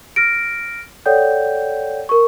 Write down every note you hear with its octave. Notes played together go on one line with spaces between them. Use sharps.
F6 A#6 D7
A4 C#5 D5 F#5 G5 G6
A#4 C#6